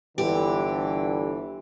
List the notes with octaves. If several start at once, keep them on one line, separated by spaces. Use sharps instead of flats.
G1 D3 E3 G4